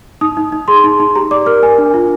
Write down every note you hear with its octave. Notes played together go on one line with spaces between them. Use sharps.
D#4 D#6
D#4
D#4
G#4 C6
D#4
D#4
G4 A#5
D5 D6
A#4 F6
A#4 G#5
D4
F4